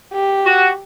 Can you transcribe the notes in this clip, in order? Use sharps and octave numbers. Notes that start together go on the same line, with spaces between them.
G4
F#4